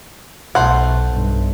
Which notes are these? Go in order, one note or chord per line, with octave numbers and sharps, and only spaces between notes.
B1 A3 C5 F#5
B1 G2